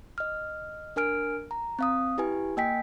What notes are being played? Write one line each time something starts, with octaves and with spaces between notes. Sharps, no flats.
D#5 F6
D4 A#4 G#5 F6 D7
A#5
C4 F5 D#6
E4 G4 B4 G#5
A#3 D#5 G5 G#5 B6